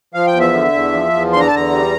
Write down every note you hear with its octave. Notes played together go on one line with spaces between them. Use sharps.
F3 F5
G5
E2
E5
D3
E2
F3
E2
D3 C6
A#5
A5
E2 A#5
G3